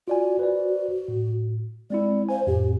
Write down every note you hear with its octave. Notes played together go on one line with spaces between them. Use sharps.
F4 F#4 D5 G#5
B4 C5 D5
A2
G#3 C4 E4 D5
C5 F5 G#5
F2 A2 G4